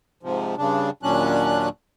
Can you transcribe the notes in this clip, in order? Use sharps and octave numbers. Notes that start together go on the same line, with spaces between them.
G#2 C3 F3
G2 C#3 D4
D#2 A#2 F#3 C#4 D4 F#6